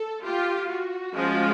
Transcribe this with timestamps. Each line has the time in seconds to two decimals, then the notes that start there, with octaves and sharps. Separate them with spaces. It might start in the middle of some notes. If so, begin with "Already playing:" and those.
Already playing: A4
0.24 F4 G4
0.69 F#4
1.14 F3 G#3 C#4 F4